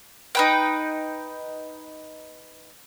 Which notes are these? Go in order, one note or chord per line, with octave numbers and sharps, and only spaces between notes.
D#4 B4 G5